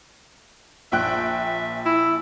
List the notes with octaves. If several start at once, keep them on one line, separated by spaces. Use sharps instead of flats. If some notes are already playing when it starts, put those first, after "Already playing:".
A#1 E5 G5 F#6
E4